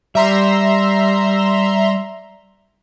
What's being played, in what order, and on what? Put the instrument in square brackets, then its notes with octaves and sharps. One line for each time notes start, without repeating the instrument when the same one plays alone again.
[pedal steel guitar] G3 [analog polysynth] E5 A#5 C6